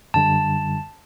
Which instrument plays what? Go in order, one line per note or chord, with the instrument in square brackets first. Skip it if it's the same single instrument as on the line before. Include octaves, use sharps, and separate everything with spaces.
[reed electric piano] F#2 D3 G3 [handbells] A5